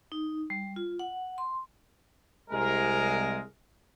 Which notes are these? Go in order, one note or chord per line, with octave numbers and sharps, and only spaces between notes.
D#4
G3
F4
F#5
C6
C2 G#3 A#4